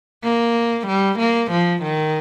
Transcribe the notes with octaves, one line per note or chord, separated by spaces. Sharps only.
A#3
G3
A#3
F3
D#3